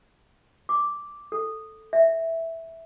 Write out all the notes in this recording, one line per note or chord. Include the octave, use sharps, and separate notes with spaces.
D6
A4
E5